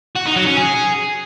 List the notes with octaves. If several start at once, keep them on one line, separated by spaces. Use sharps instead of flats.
F#4
D#4
F#3
C#4
G#4